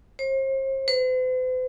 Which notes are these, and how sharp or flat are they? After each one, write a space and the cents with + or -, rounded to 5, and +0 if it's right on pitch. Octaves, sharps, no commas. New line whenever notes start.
C5 +40
C5 -45